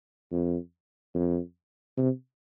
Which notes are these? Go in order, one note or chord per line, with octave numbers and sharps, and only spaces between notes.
F2
F2
C3